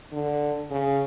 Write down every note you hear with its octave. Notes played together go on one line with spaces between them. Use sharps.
D3
C#3